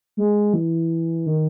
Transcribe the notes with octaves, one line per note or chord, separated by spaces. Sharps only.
G#3
E3
D#3